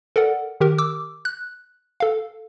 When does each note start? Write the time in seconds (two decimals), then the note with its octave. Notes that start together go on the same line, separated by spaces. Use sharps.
0.16 A4 A#4 D5 F#5
0.60 D#3 G4 A#4
0.78 D6 E6
1.25 F#6
2.00 A4 F5